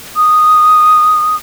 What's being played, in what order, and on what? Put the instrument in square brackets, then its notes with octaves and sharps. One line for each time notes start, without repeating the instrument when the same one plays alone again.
[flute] D#6